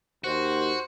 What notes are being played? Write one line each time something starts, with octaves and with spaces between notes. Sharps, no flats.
D#2 F#4 C5